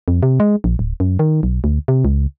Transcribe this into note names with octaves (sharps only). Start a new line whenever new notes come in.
F2
C3
G#3
A#1
D1
F#2
D#3
B1
D2
C3
C#2